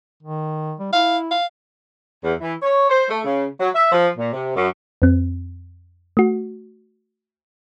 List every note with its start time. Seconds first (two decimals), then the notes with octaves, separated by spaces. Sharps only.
0.22 D#3
0.79 G3
0.93 E4 F5
1.31 F5
2.24 E2
2.40 E3
2.62 C#5
2.90 C5
3.09 A3
3.25 C#3
3.60 F#3
3.75 E5
3.92 F3
4.18 A#2
4.33 C3
4.56 F#2
5.02 F2 C4
6.17 A3 F#4